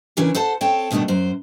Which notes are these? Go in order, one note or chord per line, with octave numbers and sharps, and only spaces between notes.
C#3 E3 C#4 D4 A#4
A4 C5 F#5 A5
C4 A4 C#5 G5
G2 B2 D#3 A3 D4
F#2 C5